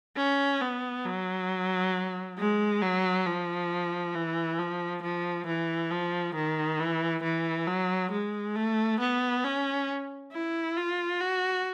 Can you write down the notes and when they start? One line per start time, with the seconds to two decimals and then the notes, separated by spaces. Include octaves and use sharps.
0.17 C#4
0.61 B3
1.05 F#3
2.38 G#3
2.82 F#3
3.26 F3
4.15 E3
4.59 F3
5.03 F3
5.47 E3
5.91 F3
6.35 D#3
6.80 E3
7.23 E3
7.67 F#3
8.11 G#3
8.56 A3
9.00 B3
9.44 C#4
10.32 E4
10.77 F4
11.20 F#4